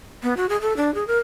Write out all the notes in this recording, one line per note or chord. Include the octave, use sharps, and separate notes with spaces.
B3
F#4
G#4
A4
D4
G#4
A#4